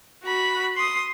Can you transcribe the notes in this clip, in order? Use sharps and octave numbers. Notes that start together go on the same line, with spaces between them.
F#4 B5
C6 D#6